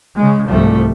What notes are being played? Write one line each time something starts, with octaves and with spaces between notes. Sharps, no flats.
C#3 G#3
C2 G#2 F3 G3 A3